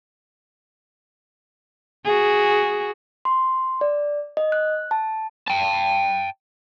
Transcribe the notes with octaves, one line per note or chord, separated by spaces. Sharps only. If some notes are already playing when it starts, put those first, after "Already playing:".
F#4 G#4
C6
D5
D#5
F#6
A5
G5 A5